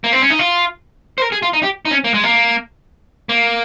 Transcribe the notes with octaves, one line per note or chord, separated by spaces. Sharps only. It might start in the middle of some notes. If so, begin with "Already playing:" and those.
A#3
C4
C#4
D#4
F4
C5
A#4
G#4
F4
D#4
G4
D#4
C#4
A#3
G#3
A#3
A#3